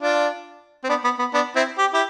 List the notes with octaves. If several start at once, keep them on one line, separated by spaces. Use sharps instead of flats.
D4 F4
C4
B3 D4
B3
B3
B3 D4
C4 E4
G4
E4 G4